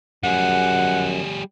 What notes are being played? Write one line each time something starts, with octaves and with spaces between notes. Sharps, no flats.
F#2 G3 G#4 F#5